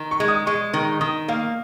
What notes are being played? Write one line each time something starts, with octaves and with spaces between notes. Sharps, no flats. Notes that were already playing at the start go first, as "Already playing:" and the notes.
Already playing: D#3
C#6
G#3
D#6
G#3 C#6
D#3
D#3 D#6
A#3 F5